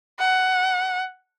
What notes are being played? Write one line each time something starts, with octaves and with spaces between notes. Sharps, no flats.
F#5